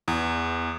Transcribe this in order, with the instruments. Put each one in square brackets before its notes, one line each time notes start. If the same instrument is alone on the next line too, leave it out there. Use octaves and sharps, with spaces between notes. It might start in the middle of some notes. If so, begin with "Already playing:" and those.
[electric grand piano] E2